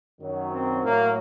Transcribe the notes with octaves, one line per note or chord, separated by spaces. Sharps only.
F#2 D#3 F#3
C4
A2 F#3 A#3